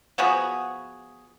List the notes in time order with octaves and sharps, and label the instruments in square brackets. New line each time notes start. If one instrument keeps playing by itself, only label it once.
[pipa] F3 B3 F#4 G#4